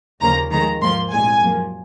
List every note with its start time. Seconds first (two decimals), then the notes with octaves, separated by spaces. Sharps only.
0.20 D#2 C#3 F3 A#3 A#5
0.51 F2 D#3 G#3 A#5
0.81 G#2 F3 A#3 C6
1.11 C2 A#2 G#3 G#5
1.40 F#2 F3 A#3